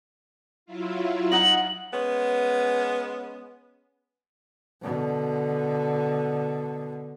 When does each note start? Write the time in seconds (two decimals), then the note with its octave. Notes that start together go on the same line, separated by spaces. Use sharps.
0.66 F#3 E4 F4
1.32 D#4 F#5 F#7
1.93 G#3 B3 C#4
4.82 B2 D3